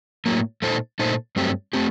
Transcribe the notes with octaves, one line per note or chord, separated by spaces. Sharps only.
A2 F#3 A#3
A#2 A3 D#4 A4 C5
A#2 A3 D#4 A4 C5
G2 F#3 A3 C4 G4
A3 C4 G4